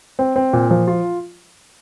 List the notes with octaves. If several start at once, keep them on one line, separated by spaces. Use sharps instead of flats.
C4
C4
A#2
F3
F4